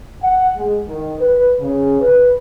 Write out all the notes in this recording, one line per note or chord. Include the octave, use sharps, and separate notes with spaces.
F#5
G#3
D#3
B4
C#3
B4